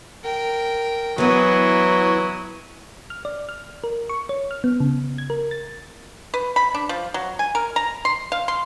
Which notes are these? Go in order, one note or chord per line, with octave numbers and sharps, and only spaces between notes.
A#4 G5
E3 F#3 B3 E4 D#6
F6
D5
F6
A#4
C#6
C#5
F6
B3
C#3
G#6
A#4
A6
B4
B5
D4
F3
F#3
G#5
A#4
A#5
C6
F5
C6